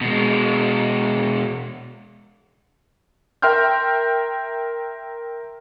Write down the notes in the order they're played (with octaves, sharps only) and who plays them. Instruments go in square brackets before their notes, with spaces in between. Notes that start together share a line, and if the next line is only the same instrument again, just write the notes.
[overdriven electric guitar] B2 G#3
[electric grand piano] A#4 E5 G5 C6 F6 G6